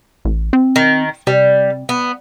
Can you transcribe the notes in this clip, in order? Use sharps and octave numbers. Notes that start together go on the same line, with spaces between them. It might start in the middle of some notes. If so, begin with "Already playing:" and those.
A1
C4
D#3
C3 G3
B3